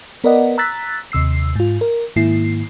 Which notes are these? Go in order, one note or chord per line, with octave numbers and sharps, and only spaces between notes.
B3 A#4 B4 D5 D#5 F#5
A#5 E6 F#6 A6 B6
D#2 C3 E6 C7
G#2 F4
A#4
G#2 D#3 A#3 E4 C7